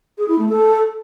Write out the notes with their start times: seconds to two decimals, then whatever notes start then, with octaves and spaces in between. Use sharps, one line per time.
0.18 G#4
0.28 E4
0.38 A3
0.49 A4